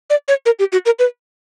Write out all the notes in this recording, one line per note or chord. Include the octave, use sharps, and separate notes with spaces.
D5
C#5
A#4
G4
F#4
A#4
B4